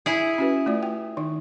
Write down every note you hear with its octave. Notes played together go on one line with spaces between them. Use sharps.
E4 G#4
C#4 F#4 B4
A3 F4 D5
G5
D#3 D#4